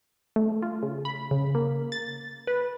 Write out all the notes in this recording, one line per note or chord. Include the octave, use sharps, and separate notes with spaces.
A3
F4
C#3
B5
C#3
A#3
A6
B4